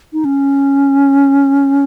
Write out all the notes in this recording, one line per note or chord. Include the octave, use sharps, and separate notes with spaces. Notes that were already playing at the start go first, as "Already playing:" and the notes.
D#4
C#4